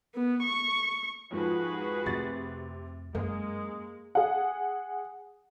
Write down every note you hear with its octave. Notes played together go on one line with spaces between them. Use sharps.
B3
C#6
F2 G#2 F3 F#4 G#4 B4
F2 C3 A3 A6
F#2 G#3 A#3
G#4 F#5